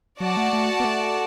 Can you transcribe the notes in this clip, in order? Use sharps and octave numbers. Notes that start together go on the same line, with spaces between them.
F#3 F#4 D5 F#5 A5
A3
A3
B3
A3